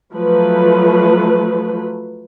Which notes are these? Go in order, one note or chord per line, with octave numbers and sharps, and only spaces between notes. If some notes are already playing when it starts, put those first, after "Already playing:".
F3 F#3 A3 B4